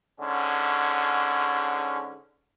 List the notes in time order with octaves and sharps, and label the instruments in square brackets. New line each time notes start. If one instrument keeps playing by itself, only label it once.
[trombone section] G#2 D3 C#4